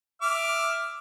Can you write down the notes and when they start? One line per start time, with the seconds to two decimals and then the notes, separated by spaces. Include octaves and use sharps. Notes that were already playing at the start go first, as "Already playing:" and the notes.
0.22 E5 D6 F6